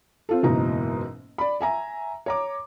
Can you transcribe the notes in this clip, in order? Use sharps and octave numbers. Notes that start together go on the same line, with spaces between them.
C4 F4 A4
F#1 G#2 B2 E3 D#4 A#5
D5 B5
E5 G#5 A#5
C#5 A#5 D6